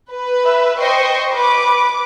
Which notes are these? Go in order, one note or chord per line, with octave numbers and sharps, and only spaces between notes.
B4
E5
C5 D#5 G5 C#6
B4 D6